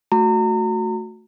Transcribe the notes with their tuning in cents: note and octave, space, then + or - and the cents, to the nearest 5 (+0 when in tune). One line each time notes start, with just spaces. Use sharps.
A3 +0 F#4 -15 A#5 -35